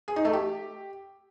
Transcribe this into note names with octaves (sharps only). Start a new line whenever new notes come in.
G#4
D#4
A3
G4